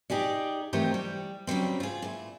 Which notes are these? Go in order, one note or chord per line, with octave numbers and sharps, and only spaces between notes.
D#4 G4 G#4 D5
E3 A3 C4 D#4 G4 A#4
G3
C#3 F#3 G3 C4
F4 G#4
A#2 E4